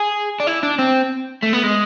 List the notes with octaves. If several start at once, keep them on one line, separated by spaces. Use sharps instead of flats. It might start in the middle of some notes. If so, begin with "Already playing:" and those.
Already playing: G#4
D4
E4
D4
C4
A3
B3
G#3